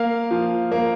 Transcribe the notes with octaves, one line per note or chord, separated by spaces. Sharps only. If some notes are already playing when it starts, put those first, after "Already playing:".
Already playing: A#3 F5
F3
A#3